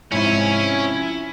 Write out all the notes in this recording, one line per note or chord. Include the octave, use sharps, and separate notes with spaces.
G#2 C3 F3 C#4 E4